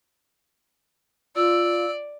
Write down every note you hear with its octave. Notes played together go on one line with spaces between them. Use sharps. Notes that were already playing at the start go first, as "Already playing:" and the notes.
F4 D5 E6